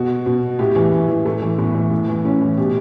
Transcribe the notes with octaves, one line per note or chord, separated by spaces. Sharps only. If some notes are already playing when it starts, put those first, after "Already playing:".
Already playing: B2 F#4
B2
A2 G4
E3
A2
E3
A2 A3
E3
A2 B3
E3
A2
E3
A2 C#4
E3
B2 G4